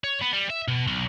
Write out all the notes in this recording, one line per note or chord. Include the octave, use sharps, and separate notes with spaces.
C#5
B3
G3
E5
B2
B1